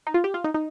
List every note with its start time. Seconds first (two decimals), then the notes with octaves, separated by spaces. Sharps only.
0.07 D#4
0.14 F4
0.24 G4
0.34 F4
0.44 D#4
0.54 D#4